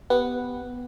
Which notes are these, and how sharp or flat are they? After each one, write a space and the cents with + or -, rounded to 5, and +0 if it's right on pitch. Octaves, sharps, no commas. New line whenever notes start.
B3 +0 G4 -5 F#5 +0